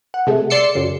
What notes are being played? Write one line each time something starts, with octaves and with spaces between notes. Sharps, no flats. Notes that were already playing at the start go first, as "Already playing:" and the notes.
F#5
C3 G#3 A3
D5 C6 D6 E6 C7 C#7
F#2 C#3